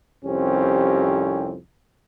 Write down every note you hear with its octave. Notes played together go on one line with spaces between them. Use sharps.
C2 F2 C4 C#4 G4